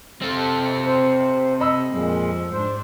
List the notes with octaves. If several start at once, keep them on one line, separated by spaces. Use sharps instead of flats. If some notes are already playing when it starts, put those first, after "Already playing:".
C3 C4 A4
C5
D#5 B5 E6
F2 A#2 F3 G#3
G#2 D4 C5